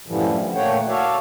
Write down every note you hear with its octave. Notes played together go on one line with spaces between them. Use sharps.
F#2 A2 D3 E3 F3 G3
D3
A#2 A3 A#3 C#5 F#5 G5
F#4 A4 C#5 D5 E5 F5